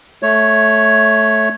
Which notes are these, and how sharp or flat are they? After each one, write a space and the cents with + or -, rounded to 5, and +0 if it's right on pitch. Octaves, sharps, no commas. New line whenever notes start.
A3 -10 C#5 +0